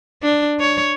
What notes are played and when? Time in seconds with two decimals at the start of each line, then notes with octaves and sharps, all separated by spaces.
0.22 D4
0.60 C#5